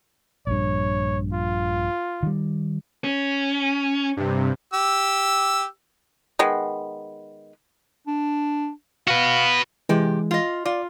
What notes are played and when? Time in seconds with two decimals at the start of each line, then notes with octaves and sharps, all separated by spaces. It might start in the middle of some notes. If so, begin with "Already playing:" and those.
0.47 A#1 G2 C#5
1.33 F4
2.23 D#3 G3
3.04 C#4
4.17 G2 C3
4.73 G4 E6
6.39 D#3 G#3 B3
8.07 D4
9.08 F#4 B4 F5
9.89 C3 E3 G#3 G4
10.31 F4 D#5
10.66 F4 D5